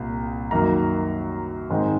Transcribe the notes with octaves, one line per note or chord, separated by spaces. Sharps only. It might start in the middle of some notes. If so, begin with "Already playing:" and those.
Already playing: C2 A#2
F#2 D#3 A#3 A#5
G#2 D#3 G#3 C4